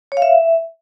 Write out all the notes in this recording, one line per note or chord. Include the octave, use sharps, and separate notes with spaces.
C#5
F5
E5